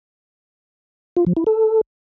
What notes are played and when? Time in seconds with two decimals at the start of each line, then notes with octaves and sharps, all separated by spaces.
1.17 F4
1.27 F3
1.37 E4
1.47 A4